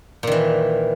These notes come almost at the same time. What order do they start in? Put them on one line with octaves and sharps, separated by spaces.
A#2 D#3 E3